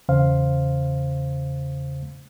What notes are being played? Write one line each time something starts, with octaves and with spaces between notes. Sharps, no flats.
E2 C#3 C5 F5